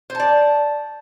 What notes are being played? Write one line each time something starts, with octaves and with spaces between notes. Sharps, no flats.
C5 D5 A5